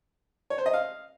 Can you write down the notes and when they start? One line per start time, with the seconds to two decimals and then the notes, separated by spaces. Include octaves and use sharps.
0.50 C#5
0.58 C5
0.66 D#5
0.73 F5